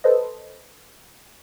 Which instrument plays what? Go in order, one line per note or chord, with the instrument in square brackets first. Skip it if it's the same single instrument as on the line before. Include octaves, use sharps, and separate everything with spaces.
[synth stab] A4 B4 C5 D#5